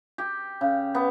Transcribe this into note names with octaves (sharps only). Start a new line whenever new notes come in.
G4
C#3
B3